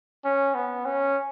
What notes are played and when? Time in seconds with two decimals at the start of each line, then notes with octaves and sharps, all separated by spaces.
0.25 C#4
0.55 B3
0.85 C#4